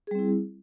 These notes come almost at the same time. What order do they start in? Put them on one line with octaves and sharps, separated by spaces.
G#4 G3 C4 E4